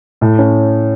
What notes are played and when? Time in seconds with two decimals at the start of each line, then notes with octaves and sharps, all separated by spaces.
0.21 A2
0.39 C#4